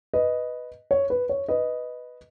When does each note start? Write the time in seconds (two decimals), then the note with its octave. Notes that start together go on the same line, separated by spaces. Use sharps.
0.14 B4 D#5
0.91 C#5
1.10 B4
1.29 C#5
1.48 B4 D#5